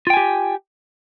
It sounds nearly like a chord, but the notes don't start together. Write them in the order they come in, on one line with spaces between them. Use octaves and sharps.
F4 G5 G#5 G4